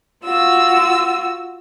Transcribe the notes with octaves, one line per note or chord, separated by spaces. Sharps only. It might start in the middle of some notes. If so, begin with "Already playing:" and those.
F4 F#4 E6